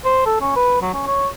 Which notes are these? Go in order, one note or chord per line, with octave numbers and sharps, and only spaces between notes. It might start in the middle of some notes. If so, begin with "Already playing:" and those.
C5
A4
C#4
B4
F#3
C#4
C#5